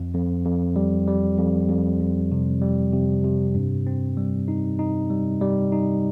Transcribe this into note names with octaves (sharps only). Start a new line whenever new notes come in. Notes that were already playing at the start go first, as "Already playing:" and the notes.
Already playing: F2
F2
F2
G3
G3
F2
F2
F2
C3
G3
C3
C3
G2
C4
G3
D#4
D#4
G3
G3
D#4